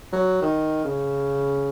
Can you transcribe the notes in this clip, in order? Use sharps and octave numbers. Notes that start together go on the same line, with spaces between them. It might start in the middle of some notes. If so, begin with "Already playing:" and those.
F#3
D#3
C#3